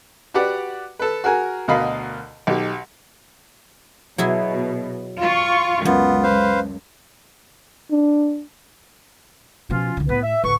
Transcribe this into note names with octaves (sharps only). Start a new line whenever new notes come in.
F#4 G4 B4 D5 F#5
A4 B4
F#4 G#4 A#4 G#5
D2 B2 A#4 D#5 F5 B5
B1 D#4 G4
B2 F#3 E4 G#4
F4 C#6
C#2 F#2 B3 F4
B4 C5 F5
D4
B2 F3 C#4 F4
C2 D3
A2 B3 B4
E5
D1 A1 D3 B4 C#6